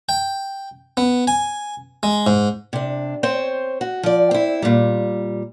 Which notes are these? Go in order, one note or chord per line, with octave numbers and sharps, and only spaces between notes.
G5
B3
G#5
G#3
G#2
C3 D4
C4 C5 C#5
F#4
F3 D5
C4 E4
A#2 G3